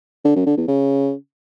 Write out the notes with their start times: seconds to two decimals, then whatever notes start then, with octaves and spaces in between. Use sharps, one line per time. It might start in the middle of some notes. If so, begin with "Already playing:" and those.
0.25 D3
0.35 F#2
0.46 D3
0.57 E2
0.68 C#3